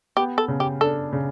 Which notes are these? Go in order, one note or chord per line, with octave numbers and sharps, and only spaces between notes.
B3 G4
A4
C#3
G4
D4 A4
C#3